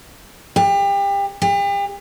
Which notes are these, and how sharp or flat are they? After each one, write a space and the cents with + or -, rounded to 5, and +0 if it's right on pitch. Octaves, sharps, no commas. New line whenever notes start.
G4 +30
G4 +40